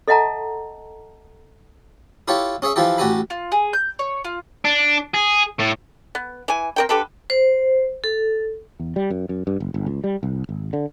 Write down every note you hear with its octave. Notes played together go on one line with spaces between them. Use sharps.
A4 D#5 E5 F#5 A5 A#5
E4 F4 G4 A4 C#5
C#4 G#4 C#5 E5
E3 F3 E4 F4 G4 A4
A1 F#4 G4 A4 G#5 B5
F4
G#4
G6
C#5
F4
D4
G#4
A2
B3
E3 G#5
C4 A#4 G5
D3 G4 A4 B4
C5
A4
E2
G3
F#2
F#2
G2
F#1
G1
C#2
G3
C2
G#1
D3